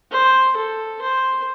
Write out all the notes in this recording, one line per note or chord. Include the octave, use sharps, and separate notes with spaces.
C5
A4
C5